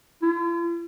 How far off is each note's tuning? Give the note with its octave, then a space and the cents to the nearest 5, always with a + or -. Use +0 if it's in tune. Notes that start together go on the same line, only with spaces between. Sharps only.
F4 -45